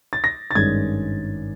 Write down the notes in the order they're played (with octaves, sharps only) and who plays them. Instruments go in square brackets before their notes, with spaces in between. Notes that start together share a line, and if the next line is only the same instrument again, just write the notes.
[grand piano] A6
A#6
A6
G#1 G2 D#3 G#3 C#4 G#6